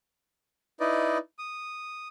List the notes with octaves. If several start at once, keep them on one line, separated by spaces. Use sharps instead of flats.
D#4 E4 B4 D5 D#5
D#6